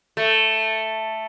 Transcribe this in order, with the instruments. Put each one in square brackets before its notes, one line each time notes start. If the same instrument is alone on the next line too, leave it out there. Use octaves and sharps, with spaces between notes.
[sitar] A3